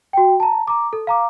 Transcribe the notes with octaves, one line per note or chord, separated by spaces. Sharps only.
F#4 G5
A5 A#5
A#5 D6
A4
F5 A#5 D6